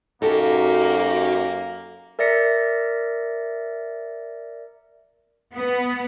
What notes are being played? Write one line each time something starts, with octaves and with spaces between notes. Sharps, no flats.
F#2 A#3 D#4 F#4 G4 A4
A#4 D5 E5 A#6 C#7
B3